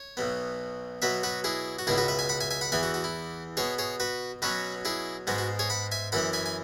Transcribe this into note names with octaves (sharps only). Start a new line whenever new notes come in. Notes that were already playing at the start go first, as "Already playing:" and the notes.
Already playing: C#5
B1 B2 B3
B2 F#3 B3 B4 E5
F#4 B4
E4 G#4
F#4
C#2 B2 B3 E4 G#4
F#4 B4
B4 E5
E5 G#5
F#5 B5
E5 G#5
E5 G#5
F#5 B5
E2 E3 B3 E5 G#5
F#4
F#4
E4
B2 B3 G#4 C#5
G#4 C#5
F#4 B4
B2 F#3 C#4 F#4 B4
E4 G#4
G#2 G#3 B3 F#4
F#4
G#4 C#5
F#5 B5
E5 G#5
F#2 E3 B3 F#5 B5
E5 G#5
G#5